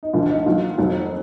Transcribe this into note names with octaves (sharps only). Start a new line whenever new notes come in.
D#4
D2 D3 F3 F4
D#4
D#2 D#3 F#3 F4
F1 F2 D#3 F#3